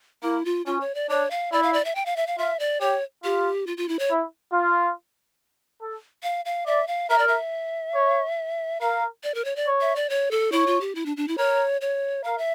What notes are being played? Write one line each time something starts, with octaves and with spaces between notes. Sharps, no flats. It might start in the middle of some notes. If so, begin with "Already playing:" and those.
A#3 E4
F4
C#4 F4
C#5
D5
D4 C#5
F5
E4 D5
F5
D5
E5
G5
F5
E5
F5
F4 E5
D5
G4 C#5
F4 G4
F4
F4
E4
C#5
E4
F4
A4
F5
F5
D5 E5
F5
A#4 E5
D5
E5
C#5
A#4 F5
D5
A#4
C#5
D5
C#5
E5
D5
C#5
A4
E4 C#5
F4
G4
E4
D4
D4
E4
A#4 C#5
C#5
A#4 F5
E5